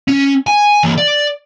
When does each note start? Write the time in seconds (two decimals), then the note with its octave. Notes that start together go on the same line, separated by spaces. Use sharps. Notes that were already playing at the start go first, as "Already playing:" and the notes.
0.08 C#4
0.47 G#5
0.83 E3 A#3
0.98 D5